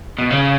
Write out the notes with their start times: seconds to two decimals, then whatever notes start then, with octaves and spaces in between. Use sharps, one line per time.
0.19 B2
0.30 C#3